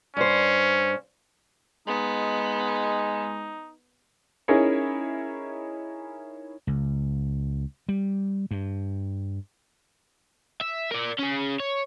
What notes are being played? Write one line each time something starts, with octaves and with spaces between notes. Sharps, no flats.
G2 C#4 C5
G#3 B3 D#4
C#4 D#4 E4 G#4 A#4 C#5
C#2
G3
G2
E5
A#4 D5
C#4 G#4
C#5